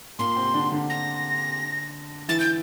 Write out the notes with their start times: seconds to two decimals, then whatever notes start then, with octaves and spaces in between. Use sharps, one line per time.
0.19 A#2 A#3 C6
0.36 C3 C4
0.54 D3 D4
0.71 D3 D4
0.90 A#6
2.28 E3 E4 A6
2.40 G6